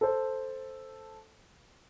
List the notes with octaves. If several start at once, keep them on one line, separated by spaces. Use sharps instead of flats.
A4 C5